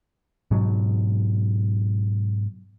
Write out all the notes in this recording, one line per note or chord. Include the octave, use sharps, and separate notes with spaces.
G#2 B2 F#3